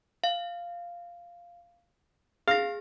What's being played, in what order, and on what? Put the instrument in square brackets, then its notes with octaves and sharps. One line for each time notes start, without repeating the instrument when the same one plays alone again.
[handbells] F5
[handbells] G#4 A#6 [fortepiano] F5